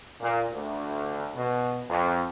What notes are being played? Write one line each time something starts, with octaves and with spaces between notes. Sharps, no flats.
A#2
D2
B2
F2